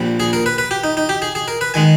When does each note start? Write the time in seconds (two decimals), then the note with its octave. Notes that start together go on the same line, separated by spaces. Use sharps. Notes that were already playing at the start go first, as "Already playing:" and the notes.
Already playing: A#1 A#2 G3
0.20 G#4
0.33 A#4
0.46 B4
0.58 B4
0.71 G4
0.84 D#4
0.97 D#4
1.09 G4
1.22 G#4
1.35 G#4
1.48 A#4
1.61 B4
1.74 D#3 G#3 G#5